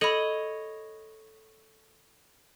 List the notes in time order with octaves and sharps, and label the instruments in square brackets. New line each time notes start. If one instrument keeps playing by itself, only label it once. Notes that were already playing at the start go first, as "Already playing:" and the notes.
[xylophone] A4 B5 [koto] C#5 D#5